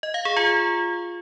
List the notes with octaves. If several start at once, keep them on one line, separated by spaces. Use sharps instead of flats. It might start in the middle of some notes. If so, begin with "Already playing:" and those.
D#5
F5
G#4
F4